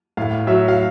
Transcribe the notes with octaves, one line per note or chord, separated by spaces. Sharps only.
A2 F5
F#3 E5
F5